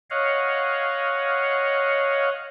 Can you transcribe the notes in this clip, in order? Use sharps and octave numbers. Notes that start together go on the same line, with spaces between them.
C#5 D#5 F5 F#5